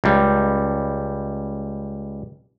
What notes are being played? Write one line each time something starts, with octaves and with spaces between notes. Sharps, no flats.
C#2 G3